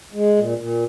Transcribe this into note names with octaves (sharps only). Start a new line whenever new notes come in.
G#3
A#2
A#2